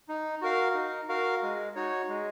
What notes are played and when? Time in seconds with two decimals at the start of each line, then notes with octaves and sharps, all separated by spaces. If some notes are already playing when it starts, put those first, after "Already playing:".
0.08 D#4
0.42 F#4 A#4 F5
0.74 D#4
1.08 F#4 A#4 F5
1.42 G#3
1.75 D#4 F#4 C#5
2.08 G#3